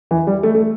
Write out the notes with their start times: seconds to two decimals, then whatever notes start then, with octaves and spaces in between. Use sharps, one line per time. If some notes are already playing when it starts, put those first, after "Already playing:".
0.11 E3
0.27 G3
0.43 A3
0.55 A3